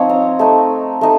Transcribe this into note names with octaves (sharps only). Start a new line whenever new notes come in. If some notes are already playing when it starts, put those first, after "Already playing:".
Already playing: F3 C4 D#4 C#5 D#5
A#5
A3 D#4
A3 D#4